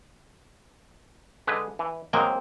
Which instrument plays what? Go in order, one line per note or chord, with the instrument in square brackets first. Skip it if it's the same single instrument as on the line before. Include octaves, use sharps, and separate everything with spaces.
[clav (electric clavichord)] D3 G#3 B4
E3
[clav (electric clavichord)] F#3 G#3 D#5 [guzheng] A#3 C4 A#4